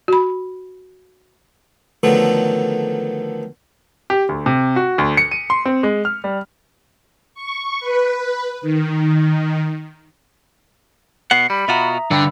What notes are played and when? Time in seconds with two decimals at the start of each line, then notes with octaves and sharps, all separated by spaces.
0.08 F#4 B5
2.03 D3 D#3 F3 F#3 A3 B3
4.10 G4
4.29 D2
4.46 C3
4.76 F#4
4.98 D2
5.17 C#7
5.31 D#7
5.50 C6
5.66 C4
5.83 G#3
6.05 F6
6.24 G3
7.34 C#6
7.80 B4
8.61 D#3
11.31 B2 B3 F#5 C7 C#7
11.50 G3 B5
11.68 B2 F4 F#4 E5 A#5 D#6
12.11 G2 D3 G5 B5 E6